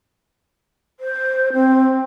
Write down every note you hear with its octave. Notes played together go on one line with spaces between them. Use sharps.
C5
C4